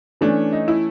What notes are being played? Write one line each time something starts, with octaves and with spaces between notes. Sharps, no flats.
E3 A3 C#4 D4
D#4
E4